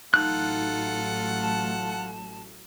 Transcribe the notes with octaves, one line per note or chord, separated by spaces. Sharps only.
A1 F#3 A3 D#4 F4 A4 F#5 F#6
A5